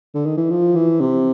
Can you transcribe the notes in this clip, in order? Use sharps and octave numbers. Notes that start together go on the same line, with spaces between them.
D3
D#3
E3
F3
E3
C3